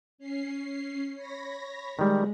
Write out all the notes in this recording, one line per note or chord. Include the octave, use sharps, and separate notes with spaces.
C#4 C7
C#5 B5 A#6
D#3 G3 G#3